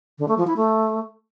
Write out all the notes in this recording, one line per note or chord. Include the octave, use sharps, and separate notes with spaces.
D3
A3
F3
E4
A3